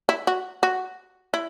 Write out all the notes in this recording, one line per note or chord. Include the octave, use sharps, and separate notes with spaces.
E4
F#4
F#4
E4